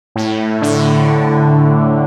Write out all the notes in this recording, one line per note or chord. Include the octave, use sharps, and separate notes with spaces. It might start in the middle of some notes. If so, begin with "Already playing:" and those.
A2
D3